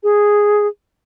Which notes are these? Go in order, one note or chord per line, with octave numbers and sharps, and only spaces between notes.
G#4